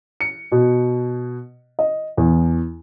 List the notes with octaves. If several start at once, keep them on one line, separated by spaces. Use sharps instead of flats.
C#7
B2
D#5
E2